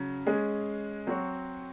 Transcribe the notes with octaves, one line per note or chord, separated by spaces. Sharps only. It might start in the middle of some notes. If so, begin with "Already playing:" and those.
Already playing: C#3 F#3
G#3 C#4 G#4
F#3 C4 F#4 C#5